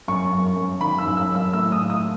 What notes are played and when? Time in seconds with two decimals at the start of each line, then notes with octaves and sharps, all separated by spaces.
0.08 F#2 C#6
0.32 F#2
0.56 F#2
0.81 D#3 B5
0.98 E6
1.06 F#2
1.17 E6
1.30 F#2
1.35 E6
1.53 A2 E6
1.72 D#6
1.78 A2
1.90 D#6